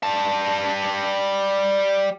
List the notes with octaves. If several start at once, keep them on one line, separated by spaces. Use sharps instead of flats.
G3 A5